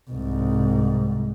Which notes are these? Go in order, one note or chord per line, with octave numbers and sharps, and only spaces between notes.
C2 G#2